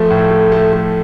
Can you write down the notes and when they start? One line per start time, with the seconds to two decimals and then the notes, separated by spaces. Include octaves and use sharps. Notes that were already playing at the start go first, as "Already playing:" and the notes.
Already playing: F3 A3 A4
0.10 A2
0.31 A3
0.52 A3
0.73 A3